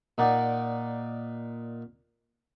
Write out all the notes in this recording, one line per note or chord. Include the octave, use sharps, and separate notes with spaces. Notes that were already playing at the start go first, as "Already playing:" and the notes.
A#2 D#4 D5 F#5